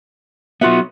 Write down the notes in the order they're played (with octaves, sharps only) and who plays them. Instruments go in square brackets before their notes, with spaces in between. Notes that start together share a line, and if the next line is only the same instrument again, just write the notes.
[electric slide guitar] F#3 B3 [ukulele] F4 F#4 E5